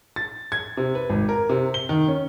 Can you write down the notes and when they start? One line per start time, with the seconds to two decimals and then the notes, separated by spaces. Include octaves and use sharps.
0.16 A6
0.52 G#6
0.77 C3
0.95 B4
1.10 G#1
1.29 A#4
1.49 C3
1.74 G7
1.89 D#3
2.08 C#4